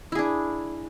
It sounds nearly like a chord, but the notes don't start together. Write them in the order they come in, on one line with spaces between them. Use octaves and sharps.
E4 G#4 D4